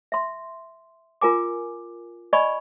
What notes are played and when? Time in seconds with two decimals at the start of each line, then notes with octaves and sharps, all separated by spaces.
0.12 E5 C6
1.21 F4 A#4 G#5 D6
2.33 D5 D#5 G#5 B5 C#6